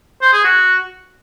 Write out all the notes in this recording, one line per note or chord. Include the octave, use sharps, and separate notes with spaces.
C5
G#4
F#4